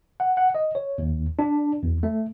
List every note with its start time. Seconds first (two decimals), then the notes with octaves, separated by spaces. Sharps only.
0.20 F#5
0.37 F#5
0.55 D#5
0.75 C#5
0.98 D#2
1.39 D4
1.83 E2
2.03 A3